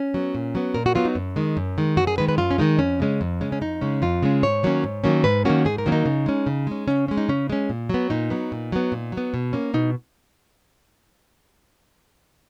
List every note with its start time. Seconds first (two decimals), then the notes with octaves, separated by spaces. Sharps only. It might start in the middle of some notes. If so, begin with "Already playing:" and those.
Already playing: C#4
0.14 F#3 B3
0.35 A#2
0.55 F#3 B3
0.75 A#2 A#4
0.86 F#4
0.95 F#3 B3 F4
1.05 D#4
1.15 F#2
1.36 D#3 G#3
1.57 F#2
1.78 D#3 G#3
1.97 F#2 F#4
2.07 G#4
2.18 D#3 G#3 B4
2.29 B4
2.38 F#2 F4
2.51 C#4
2.58 D#3 G#3 D#4
2.79 F2 C#4
3.00 C#3 G#3 C#4
3.21 F2
3.41 C#3 G#3 C#4
3.52 C#4
3.61 F2 D#4
3.81 C#3 G#3 C#4
4.02 F2 F4
4.23 C#3 G#3 C#4
4.43 G#2 C#5
4.63 D#3 F#3 A#3 C#4
4.84 G#2
5.04 D#3 F#3 A#3 C#4
5.24 G#2 B4
5.45 D#3 F#3 A#3 C#4 F#4
5.65 G#2 G#4
5.78 A#4
5.86 D#3 F#3 A#3 C#4
5.92 D#4
6.06 C#3
6.26 G#3 C#4
6.46 C#3
6.67 G#3 C#4
6.88 C#3 C#4
7.08 G#3 C#4
7.17 D#4
7.28 C#3 C#4
7.50 G#3 C#4
7.70 A#2
7.89 F#3 B3
8.10 A#2 D#4
8.30 F#3 B3
8.52 A#2
8.72 F#3 B3
8.92 A#2
9.12 F#3
9.17 B3
9.34 B2
9.53 A#3 C#4
9.74 B2 D#4